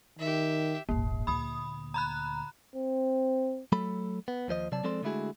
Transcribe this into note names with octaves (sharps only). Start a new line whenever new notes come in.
D#3 G4 E5
D#1 G#1 A#3
D2 A#2 B5 D#6
A#5 B5 F#6
C4
F#3 A3 A4 B5
B3
D#2 F3 C5 D#5
C3 F#3 D5 A5
F3 G#3 C4 A4 D5 C6
D3 G#3 A3 E4 F#4 G#4